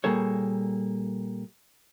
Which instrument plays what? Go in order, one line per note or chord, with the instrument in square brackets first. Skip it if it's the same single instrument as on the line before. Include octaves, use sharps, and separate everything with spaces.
[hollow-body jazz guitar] A#2 G3 A#3 G#4 A4 C#5